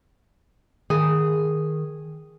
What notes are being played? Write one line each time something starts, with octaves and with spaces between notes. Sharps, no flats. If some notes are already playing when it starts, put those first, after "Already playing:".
D#3 G#4